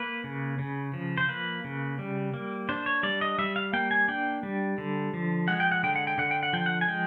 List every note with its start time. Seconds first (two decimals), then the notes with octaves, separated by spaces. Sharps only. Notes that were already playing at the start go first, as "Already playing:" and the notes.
Already playing: A#3 B4
0.24 C#3
0.59 C#3
0.94 F3
1.17 C5
1.29 A#3 B4
1.64 C#3
1.99 G3
2.34 A#3
2.69 D4 C5
2.86 C#5
3.03 G3 D5
3.21 D#5
3.38 G3 E5
3.56 F5
3.73 A#3 G5
3.91 G#5
4.08 D4 G5
4.43 G3
4.78 D3
5.14 F3
5.48 G#3 F#5
5.60 G5
5.72 F#5
5.83 D3 G5
5.96 F#5
6.07 G5
6.18 D3 F#5
6.31 G5
6.43 F#5
6.53 F3 G5
6.66 F#5
6.81 G#5
6.88 G#3 G5